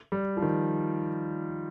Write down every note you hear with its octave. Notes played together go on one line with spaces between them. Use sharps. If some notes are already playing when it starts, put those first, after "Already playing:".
G3
F3
D#3